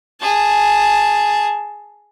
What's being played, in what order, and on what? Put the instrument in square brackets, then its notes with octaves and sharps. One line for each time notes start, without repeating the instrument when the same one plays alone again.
[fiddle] G#4 A5